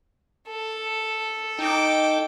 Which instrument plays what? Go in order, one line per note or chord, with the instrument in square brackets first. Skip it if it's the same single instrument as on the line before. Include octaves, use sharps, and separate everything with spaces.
[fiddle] A4
[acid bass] D#4 [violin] G5 D6